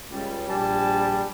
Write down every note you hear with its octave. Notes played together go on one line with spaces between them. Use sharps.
C#2 G3
A#1 G3 G#5 A5